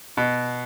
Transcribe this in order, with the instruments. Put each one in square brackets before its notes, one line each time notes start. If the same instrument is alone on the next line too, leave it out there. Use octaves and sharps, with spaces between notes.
[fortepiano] B2